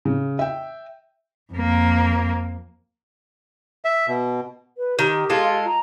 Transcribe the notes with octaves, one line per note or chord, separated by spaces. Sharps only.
C#3
E5 G5
F2 A#3
E5
B2
B4
D#3 G4
G#3 F4 A4
A#5